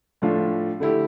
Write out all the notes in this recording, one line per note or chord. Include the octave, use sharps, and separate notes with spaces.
A2 F3 A3 D4 F4
D3 A3 E4 G4